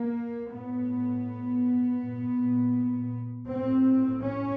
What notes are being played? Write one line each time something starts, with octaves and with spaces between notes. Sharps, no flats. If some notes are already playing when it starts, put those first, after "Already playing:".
Already playing: A#3
A2 B3
A#2
A2 C4
C#4